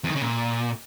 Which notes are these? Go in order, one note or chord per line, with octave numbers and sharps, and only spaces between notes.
E2
D#3
C#3
A#2